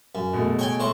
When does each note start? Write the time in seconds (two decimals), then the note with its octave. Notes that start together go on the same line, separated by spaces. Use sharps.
0.15 F#2
0.33 B2 G#3 A3
0.59 C#5 G5 G#5
0.80 A2 C5 C#6